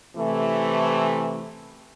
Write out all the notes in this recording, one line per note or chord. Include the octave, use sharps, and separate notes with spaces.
C3 E3 A3